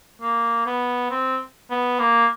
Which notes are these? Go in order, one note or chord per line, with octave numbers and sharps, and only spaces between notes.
A#3
B3
C4
B3
A#3